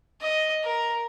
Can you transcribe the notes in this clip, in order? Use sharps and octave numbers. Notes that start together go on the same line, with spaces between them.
D#5
A#4